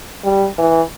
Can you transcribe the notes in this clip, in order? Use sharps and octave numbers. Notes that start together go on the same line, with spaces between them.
G3
E3